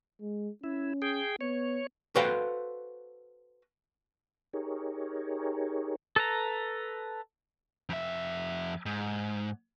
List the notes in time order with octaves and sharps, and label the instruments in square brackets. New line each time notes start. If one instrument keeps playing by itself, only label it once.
[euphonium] G#3
[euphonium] C#4 [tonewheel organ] E4
[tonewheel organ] G#4 G5
[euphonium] B3 [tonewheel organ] C#5
[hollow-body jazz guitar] F#4 A4 B4 C5 F5 G5
[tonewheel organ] D#4 G4 G#4 A#4 C#5
[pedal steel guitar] A4 B4 A#5
[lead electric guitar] F2 E5
G#2